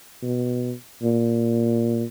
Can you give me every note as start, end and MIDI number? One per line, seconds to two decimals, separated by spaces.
0.22 0.73 47
1.02 2.04 46